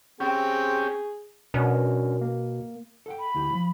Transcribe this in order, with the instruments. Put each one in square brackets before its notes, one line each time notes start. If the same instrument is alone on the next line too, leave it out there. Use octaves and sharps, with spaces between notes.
[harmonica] C4 [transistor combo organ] C#4 G4 [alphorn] G#4
[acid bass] B2 [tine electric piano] C#4 D4 A#4
[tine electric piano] A#3
[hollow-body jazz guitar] A4 F#5 G5
[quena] B5
[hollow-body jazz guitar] D2 E4 G4
F3